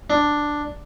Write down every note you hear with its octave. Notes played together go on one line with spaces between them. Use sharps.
D4